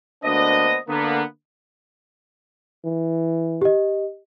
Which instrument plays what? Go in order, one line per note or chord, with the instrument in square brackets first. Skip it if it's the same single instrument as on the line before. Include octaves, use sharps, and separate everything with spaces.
[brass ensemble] D2 A#3 B3 D4 C5 D#5
D3 A#3 B3
[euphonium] E3
[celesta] G4 D#5